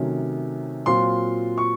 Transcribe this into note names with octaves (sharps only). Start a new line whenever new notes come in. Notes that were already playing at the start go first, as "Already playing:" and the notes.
Already playing: C3 D#3 F#3 A3 C#4
A#2 F#3 C4 F4 C6
C#6